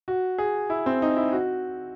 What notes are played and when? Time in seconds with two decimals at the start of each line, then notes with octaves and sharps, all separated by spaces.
0.08 F#4
0.38 G#4
0.70 E4
0.86 C4
1.02 D#4
1.17 E4
1.32 F#4